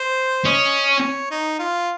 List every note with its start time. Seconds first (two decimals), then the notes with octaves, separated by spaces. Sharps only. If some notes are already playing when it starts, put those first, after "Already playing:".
Already playing: C5
0.45 C#4 D#5
0.88 C#5
1.31 D#4
1.59 F4